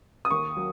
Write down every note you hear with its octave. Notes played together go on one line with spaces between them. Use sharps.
D#6
D#2 C#6
F#3